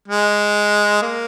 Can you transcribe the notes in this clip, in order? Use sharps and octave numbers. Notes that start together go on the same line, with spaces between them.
G#3
A#3